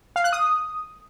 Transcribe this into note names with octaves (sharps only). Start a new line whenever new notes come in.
F5
F#6
D#6